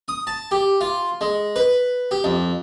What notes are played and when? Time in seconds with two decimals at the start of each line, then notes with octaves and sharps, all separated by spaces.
0.08 D#6
0.27 A5
0.51 G4
0.81 F4
1.21 G#3
1.56 B4
2.11 G4
2.24 F2